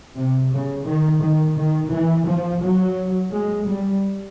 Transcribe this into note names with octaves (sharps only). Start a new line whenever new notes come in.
C3
C#3
D#3
D#3
D#3
E3
F3
F#3
G#3
G3